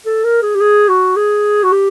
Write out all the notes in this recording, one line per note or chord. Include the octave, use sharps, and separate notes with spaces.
A4
A#4
G#4
G4
G#4
F#4
G#4
F#4
G4